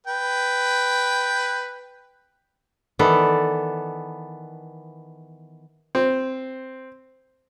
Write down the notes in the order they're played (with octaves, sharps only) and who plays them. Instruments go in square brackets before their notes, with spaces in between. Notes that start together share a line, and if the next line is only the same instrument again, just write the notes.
[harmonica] B4 G5
[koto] D#3 E3 B3 A4 D5
[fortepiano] C4